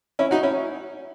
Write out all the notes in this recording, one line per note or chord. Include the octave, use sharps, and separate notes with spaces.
C#4 E4
D#4 F#4
C#4 E4